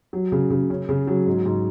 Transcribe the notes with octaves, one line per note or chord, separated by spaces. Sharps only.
F#3
C#3
C#3
C#4
C#3
F#3
G#2
G#2